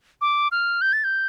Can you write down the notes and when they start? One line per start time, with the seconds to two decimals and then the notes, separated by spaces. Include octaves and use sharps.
0.21 D6
0.52 F6
0.81 G6
0.93 A6
1.04 G6